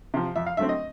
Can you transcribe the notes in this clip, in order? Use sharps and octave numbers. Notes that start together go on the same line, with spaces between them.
C3 F3
F2 E5
F5
D3 F#3 A3 C4 E5
D#5